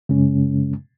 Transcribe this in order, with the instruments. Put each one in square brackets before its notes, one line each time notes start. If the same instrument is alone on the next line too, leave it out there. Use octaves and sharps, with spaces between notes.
[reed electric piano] F#2 C#3 G#3 C#4